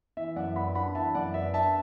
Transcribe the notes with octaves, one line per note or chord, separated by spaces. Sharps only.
E3 E5
F#2 D5 F#5
B3 F#5 B5
D4 F#5 B5
E3 E5 A5
F#2 D5 F#5
B3 E5
D4 E5 A5